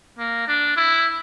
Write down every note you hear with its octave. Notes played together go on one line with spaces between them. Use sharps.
A#3
D4
E4